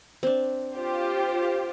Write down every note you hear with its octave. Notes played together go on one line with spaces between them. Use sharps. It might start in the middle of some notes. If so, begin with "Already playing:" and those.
C4 D4
F4 G4 C5